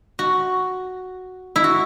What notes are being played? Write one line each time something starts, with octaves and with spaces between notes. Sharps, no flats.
F#4
E4
F#4